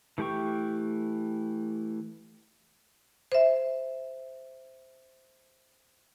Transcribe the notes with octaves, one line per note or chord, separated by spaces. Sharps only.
E3 A3 G4 G5 C#6
C5 E5